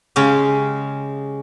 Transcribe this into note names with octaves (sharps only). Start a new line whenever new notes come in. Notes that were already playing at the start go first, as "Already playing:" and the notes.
C#3 G#3 C#4 G4